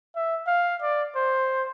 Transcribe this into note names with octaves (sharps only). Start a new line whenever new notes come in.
E5
F5
D5
C5